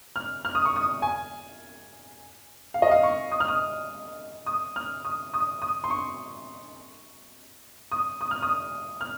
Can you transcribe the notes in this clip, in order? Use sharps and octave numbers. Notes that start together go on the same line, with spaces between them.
F6
F6
D#6
C#6
D#6
G#5
F5
D#5
F5
C#6
D#6
F6
D#6
D#6
F6
D#6
D#6
D#6
C6
C#6
D#6
D#6
F6
D#6
F6